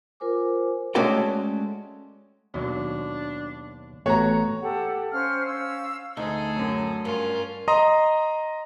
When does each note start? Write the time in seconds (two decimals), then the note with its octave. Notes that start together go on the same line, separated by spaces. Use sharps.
0.20 F4 A#4 C5 G#5 D6
0.95 G#3 A3 C#4 F#4 D5 G5
2.54 D#2 B2 F#3 D4
4.06 A1 A3 B3 F#4 C#5 A#5
4.62 G4 A4 F#5
5.13 C#4 C5 F5 F6
5.49 C#4 F5 E6
6.17 D2 D#4 G#4 A4
6.56 F#2 F#3
7.05 G2 C#4 F4 A#4
7.68 D#5 A#5 C6 D#6